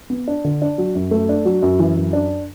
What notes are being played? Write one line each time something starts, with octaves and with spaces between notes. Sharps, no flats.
B3
D4
D3
D4
F#3
F#2
A3
D4
F#3
F#2
E3
F#2
D4